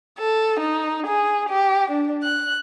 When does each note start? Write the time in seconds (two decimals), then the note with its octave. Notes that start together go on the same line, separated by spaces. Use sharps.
0.19 A4
0.60 D#4
1.07 G#4
1.49 G4
1.91 D4
2.23 F#6